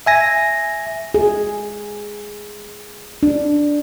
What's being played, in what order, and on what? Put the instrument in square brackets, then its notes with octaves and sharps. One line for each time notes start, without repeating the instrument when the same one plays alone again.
[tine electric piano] E5 G#5 A#6
[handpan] G#4
D4